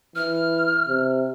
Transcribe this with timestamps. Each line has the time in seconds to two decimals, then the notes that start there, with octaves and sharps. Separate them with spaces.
0.16 E3 F6
0.88 C3